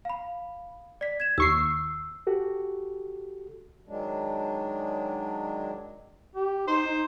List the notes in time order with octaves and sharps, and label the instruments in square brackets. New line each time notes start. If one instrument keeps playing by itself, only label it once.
[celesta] F5 B5
D5 B6
G#6 E7
[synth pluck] D#2 C#6 C7 [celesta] E6
[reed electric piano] F#4 G4 A4
[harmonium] D#3 F#3 G#3 D4
[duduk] G4
[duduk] D#4 [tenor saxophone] C5
[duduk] D#4